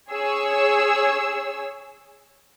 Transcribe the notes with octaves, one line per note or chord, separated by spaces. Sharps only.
G#4 C#5 E6